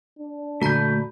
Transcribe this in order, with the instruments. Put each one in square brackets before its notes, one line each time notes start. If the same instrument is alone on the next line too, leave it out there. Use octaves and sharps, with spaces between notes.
[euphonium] D4
[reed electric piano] A#2 D3 B5 [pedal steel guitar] A3 G6 [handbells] F#4 A#5 B6